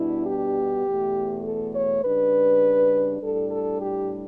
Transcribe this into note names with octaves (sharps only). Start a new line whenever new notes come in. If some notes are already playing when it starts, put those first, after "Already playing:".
Already playing: B2 G3 B3 D4 E4
G4
E2 B2 A3
A4
C#5
C#3 G3 D4 B4
A2 G3 D4 A4
A4
G4